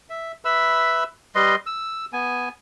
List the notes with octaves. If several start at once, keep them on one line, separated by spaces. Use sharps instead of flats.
E5
B4 E5 B5 E6
G3 B4 D#5 C6
E6
B3 G#5